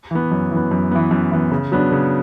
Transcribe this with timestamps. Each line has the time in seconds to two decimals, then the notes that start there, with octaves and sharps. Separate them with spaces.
0.11 E3 B3
0.31 F#2
0.51 E3 B3
0.71 F#2
0.91 E3 B3
1.11 F#2
1.31 E3 B3
1.52 C#3
1.72 F#3 B3 D4
1.92 C#3